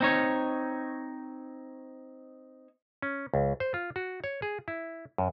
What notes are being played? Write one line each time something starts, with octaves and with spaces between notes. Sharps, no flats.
C4 D#4 C#5
C#4
C#2
C5
F4
F#4
C#5
G#4
E4
F#2